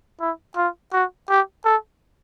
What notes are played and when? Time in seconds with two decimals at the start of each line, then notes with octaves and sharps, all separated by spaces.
0.20 E4
0.57 F4
0.93 F#4
1.30 G4
1.65 A4